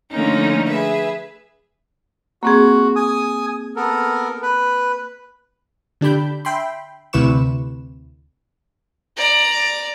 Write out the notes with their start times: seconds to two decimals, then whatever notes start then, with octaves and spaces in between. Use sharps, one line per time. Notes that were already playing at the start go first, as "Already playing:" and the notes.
0.11 D3 F3 A3 A#3 C#4 D#4
0.68 G#4 B4 E5
2.43 A#3 C4 F#4 G#4
2.96 G#5 D#6
3.76 B3 A4 A#4
4.43 B4
6.01 D3 D4 G4 B5 G6
6.45 E5 G5 B5 C6
7.13 D2 C3 E4 B4 C#6 E7
9.17 D5 A#5